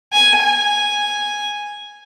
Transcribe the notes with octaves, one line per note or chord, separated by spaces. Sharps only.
G#5
G#5